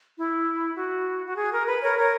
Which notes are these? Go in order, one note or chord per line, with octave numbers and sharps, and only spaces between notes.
E4
F#4
F#4
G#4
A#4
B4
A#4 C#5
A#4 C#5